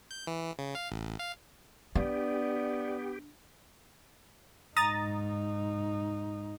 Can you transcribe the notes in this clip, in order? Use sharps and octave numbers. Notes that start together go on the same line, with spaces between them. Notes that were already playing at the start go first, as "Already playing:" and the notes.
G6
E3
C#3
F5
A1
F5
B3 D4 G4 D5
G#2 D#4 A#5 D#6 A6